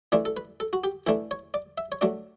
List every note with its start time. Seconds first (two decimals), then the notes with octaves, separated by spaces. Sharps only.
0.12 E3 A3 D4 D5
0.25 A4
0.37 B4
0.60 A4
0.73 F#4
0.84 G4
1.07 E3 A3 D4 A4
1.31 C#5
1.54 D5
1.78 E5
1.92 C#5
2.01 F#3 A3 D4 D5